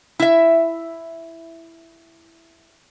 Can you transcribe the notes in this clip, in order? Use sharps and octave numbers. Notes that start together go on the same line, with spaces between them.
E4 E5